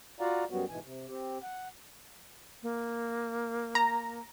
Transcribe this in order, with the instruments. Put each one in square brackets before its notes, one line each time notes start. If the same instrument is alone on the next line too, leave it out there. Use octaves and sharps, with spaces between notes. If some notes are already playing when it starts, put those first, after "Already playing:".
[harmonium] F4 F#4 D5 F5 F#5 A#5
F#2 F#3 G3 B3 F#4
G#2 B2 E3 G#5
C3
C4 G4
F#5
[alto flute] A#3
[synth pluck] A#5